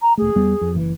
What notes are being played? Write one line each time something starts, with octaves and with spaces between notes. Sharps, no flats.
A#5
E1 A3 G#4
E2 G3 B3
F2
F#1 E3